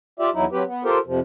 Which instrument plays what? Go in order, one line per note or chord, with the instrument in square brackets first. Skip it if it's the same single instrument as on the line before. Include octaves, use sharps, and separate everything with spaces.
[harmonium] F4 G4 D5 E5
E2 F#3 D#4 E4
F#3 C4 G4 B4
B3
F4 G4 A4 A#4 C5
F2 C3 F3